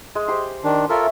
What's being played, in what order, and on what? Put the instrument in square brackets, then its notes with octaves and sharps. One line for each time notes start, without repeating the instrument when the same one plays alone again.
[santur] G#3
G4 C5 C6
[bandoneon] D#3 D4
[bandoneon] F4 A4 A#4 [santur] C#5 E5 G#5